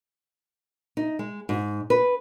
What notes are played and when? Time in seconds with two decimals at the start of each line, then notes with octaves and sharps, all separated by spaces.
0.97 D#4
1.19 G#3
1.49 G#2
1.90 B4